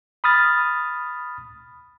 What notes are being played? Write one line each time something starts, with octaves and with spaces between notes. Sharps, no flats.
B5 D#6 F6 A6